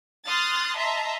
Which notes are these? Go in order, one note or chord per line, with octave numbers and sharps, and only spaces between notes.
C6 D#6 F6 F#6 A6
D#5 E5 A5 A#5 C6